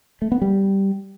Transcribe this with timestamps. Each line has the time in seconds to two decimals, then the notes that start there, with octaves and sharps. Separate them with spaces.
0.22 A3
0.32 B3
0.42 G3